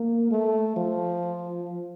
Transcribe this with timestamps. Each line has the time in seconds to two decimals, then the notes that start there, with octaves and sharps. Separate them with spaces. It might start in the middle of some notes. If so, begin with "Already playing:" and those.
Already playing: A#3
0.31 A3
0.76 F3